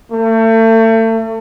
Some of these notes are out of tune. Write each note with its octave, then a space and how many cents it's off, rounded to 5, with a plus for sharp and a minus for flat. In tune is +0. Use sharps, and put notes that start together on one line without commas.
A3 +35